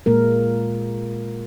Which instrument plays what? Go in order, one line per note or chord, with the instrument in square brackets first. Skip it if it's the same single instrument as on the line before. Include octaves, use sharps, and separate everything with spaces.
[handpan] A#2 G#3 A#3 A#4